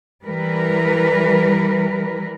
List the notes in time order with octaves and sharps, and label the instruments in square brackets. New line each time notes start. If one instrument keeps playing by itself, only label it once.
[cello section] E3 G3 A#4 B4